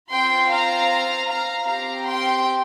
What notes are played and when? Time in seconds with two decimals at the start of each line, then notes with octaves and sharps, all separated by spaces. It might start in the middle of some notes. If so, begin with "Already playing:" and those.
0.10 C4 F4 G5 C6
0.51 F5 A#5
1.28 F5 A#5
1.67 C4 G4 F5 A#5
2.07 G5 C6